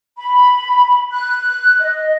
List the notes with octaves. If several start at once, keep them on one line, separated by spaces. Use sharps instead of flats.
B5
F#6
D#5